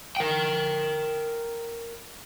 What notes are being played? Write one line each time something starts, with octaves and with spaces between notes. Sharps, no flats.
A#4 G5